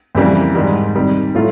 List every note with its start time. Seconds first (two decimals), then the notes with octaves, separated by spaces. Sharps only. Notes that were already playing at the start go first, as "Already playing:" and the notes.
0.15 F2 C#3 E3 G3 A#3
0.55 G#2 D#3 G3
0.95 C3 D#3 G3
1.35 A2 F#3 A3 F4